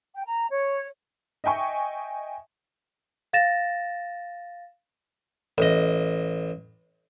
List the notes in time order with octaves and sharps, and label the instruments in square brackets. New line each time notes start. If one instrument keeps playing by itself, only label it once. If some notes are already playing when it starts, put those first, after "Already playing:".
[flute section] G5
A#5
C#5
[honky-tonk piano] D#5 E5 G5 G#5 C#6
[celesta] F5 A6 A#6 E7
[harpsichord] A1 D#5